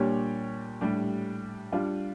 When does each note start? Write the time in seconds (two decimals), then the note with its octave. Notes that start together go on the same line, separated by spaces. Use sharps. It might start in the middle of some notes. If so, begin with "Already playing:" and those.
Already playing: A#2 G3 D4 G4 C#5
0.81 A2 G3 D4 G4
1.72 G3 D4 F4